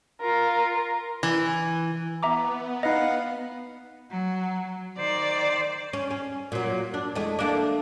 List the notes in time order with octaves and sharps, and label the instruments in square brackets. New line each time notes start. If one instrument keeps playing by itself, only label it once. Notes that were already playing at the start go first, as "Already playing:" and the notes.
[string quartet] F4 A#4
[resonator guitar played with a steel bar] E3
[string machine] B3 [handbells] E5 A#5 D6
[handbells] D#4 D#5 [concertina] B4 F5 F#5
[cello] F#3
[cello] D#3 [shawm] C5 [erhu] D5
[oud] C#4
C#4
A#2 F#3
D4
E2 G#3 A3
A3 A#3 D4